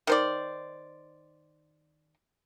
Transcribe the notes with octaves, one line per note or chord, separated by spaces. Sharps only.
D#3 C5 D5